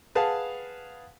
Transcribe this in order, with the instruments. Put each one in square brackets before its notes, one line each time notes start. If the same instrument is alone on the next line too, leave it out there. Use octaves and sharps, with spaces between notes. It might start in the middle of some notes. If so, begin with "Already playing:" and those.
[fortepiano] G#4 B4 F5 F#5 A5